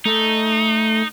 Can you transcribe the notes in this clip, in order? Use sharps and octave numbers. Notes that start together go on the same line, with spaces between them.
A3 D#4